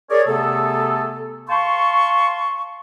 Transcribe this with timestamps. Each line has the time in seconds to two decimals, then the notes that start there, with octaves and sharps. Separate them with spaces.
0.10 G#4 A#4 C#5 D5
0.27 C3 A3 B3 G#4 A4
1.49 F5 A5 C6 C#6